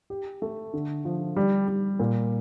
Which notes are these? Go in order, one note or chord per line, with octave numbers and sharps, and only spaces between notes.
G4
A3
D3
F3
G3
G3
A#2